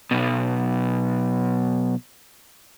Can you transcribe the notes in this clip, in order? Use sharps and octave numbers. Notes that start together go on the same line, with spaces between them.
B1 B2